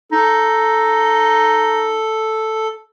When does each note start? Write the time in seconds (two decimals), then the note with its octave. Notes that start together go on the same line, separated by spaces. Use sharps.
0.12 D#4 A4